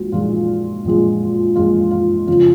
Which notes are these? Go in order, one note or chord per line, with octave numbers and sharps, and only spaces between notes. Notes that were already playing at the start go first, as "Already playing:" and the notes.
Already playing: A#1 A#2 G#3 F#4
A#1 A#2 G#3 F4
A#1 A#2 G#3
A#1 A#2 G#3 F4
F4
F2 C#3 F3 F4